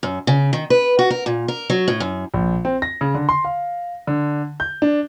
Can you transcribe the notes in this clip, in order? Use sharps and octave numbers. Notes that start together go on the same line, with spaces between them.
F#2
C#3
D#3
B4
F#4
A#4
A#2
A#4
F#3
A2
F#2
A#1
C4
A#6
C#3
D3
C6
F5
D3
G6
D4